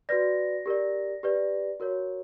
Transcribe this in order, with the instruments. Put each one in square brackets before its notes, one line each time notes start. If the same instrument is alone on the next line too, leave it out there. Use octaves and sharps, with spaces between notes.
[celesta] F#4 B4 D5 A#6
G4 A#4 D5
G4 B4 D5
F#4 A#4 C#5